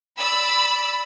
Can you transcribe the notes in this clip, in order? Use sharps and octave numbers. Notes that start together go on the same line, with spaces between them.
D5 B5 E6